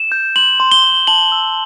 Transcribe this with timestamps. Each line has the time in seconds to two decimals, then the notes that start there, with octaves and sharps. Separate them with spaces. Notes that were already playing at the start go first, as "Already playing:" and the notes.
Already playing: E7
0.12 G6
0.36 C6 F#7
0.60 C6
0.72 G7
0.84 C6
1.07 A5 F#7
1.32 E6